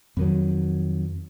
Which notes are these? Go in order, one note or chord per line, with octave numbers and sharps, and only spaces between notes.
F2 D#3 F#3